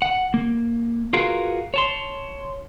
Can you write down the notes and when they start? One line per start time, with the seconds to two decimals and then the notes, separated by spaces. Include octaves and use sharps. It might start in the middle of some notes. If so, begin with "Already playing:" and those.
0.02 F#5
0.34 A#3
1.13 F4 F#4 G#4 A#4 B4 F5
1.74 C#5 A5 C6